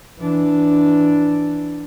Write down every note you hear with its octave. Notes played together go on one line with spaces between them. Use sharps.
E3 D4